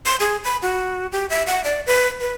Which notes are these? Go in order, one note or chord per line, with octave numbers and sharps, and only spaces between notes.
C6
G#4
B5
F#4
G4
E5
F#5
D5
B4
B4